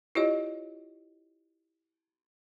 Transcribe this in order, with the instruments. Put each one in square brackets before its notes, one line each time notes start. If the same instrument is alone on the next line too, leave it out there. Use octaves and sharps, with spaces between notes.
[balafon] E4 F4 G4 C#5 D#5